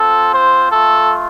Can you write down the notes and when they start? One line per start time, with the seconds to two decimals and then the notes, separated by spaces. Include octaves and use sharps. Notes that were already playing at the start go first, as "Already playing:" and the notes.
Already playing: C4 F4 A4
0.33 C5
0.72 A3 F4 A4